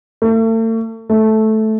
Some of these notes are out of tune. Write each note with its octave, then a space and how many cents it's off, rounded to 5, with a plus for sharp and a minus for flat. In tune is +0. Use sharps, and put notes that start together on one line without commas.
A3 +40
A3 -10